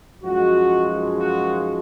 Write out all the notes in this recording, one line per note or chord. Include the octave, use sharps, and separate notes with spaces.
F#2 F3 G#3 D#4 F#4
F#4